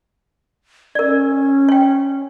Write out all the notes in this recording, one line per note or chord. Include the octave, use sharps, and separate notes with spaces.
C#4 A#4 D5
C#5 G5